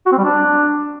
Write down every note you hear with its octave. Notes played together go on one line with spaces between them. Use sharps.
F#4
C4
G3
D4